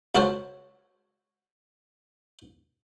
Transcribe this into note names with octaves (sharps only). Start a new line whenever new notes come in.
C#2 F#4 A4 A#4 C5 C#5